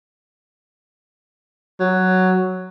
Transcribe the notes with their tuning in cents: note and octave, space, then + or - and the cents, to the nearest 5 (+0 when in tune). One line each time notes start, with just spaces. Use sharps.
F#3 +5